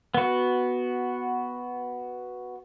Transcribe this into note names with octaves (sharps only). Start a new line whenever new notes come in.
B3 F#4